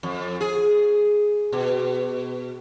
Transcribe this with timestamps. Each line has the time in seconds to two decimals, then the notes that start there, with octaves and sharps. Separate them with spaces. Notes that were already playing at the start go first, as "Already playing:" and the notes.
0.03 F2
0.41 G#4
1.53 B2